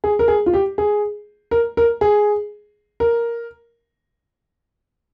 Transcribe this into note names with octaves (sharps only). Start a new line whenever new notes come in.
G#4
A#4
G#4
F4
G4
G#4
A#4
A#4
G#4
A#4